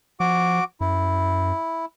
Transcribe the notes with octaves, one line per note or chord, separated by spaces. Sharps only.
F3 F#4 D6
F#2 E4